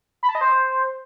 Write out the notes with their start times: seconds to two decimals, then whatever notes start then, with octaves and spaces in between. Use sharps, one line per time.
0.23 B5
0.29 A5
0.35 D#5
0.41 C5